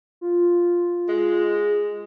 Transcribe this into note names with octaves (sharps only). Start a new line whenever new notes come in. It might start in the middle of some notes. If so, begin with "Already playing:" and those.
F4
G#3